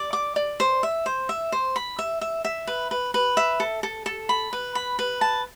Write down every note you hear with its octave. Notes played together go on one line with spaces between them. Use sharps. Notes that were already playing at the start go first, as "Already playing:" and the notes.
Already playing: D5
D6
D5
C5
E5
C5
E5
C5
B5
E5
E5
E5
B4
B4
B4
E5
A4
A4
A4
B5
B4
B5
B4
A5